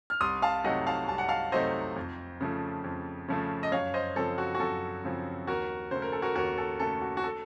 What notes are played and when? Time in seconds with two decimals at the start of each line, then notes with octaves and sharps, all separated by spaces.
0.10 F6
0.21 C2 C6 D#6
0.42 F5 A5
0.64 C3 F#3 A3 D#4 D#5 F#5
0.87 F5 A5
1.08 C2 A5
1.18 F#5
1.28 F5 A5
1.52 C3 F#3 A3 D#4 C5 D#5
1.96 F2
2.41 C#3 F3 A3
2.84 F2
3.28 C#3 F3 A3
3.63 D#5
3.72 F#2 C#5 F5
3.94 C5 D#5
4.16 C#3 F3 C4 A4
4.38 F#4
4.55 F#4
4.60 F#2 A4
5.04 C#3 F3 C4
5.47 D#2 F#4 A#4
5.91 C#3 A3 C5
6.02 A#4
6.12 A4
6.22 F#4 A#4
6.35 D#2 F#4 A#4
6.58 A4
6.80 C#3 A3 A4
7.01 F#4
7.17 F#4
7.23 A4